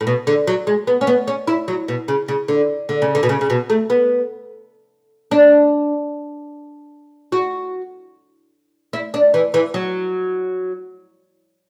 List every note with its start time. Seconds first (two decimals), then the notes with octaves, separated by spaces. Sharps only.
0.01 A2
0.07 B2
0.27 D3
0.47 F#3
0.67 G#3
0.87 B3
1.01 C#4
1.07 B3
1.28 C#4
1.48 E4
1.68 F#3
1.88 B2
2.08 C#3
2.28 C#3
2.48 D3
2.89 D3
3.02 C#3
3.15 D3
3.23 B2
3.29 C#3
3.41 C#3
3.50 B2
3.70 A3
3.90 B3
5.31 D4
7.32 F#4
8.93 E4
9.14 D4
9.34 E3
9.54 E3
9.74 F#3